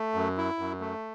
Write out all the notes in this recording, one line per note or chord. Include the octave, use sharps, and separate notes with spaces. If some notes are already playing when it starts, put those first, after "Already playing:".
Already playing: A3
F#2
E4
F#2
A3